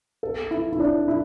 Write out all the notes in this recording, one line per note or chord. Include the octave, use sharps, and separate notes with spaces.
A4
E4
E4
D4
E4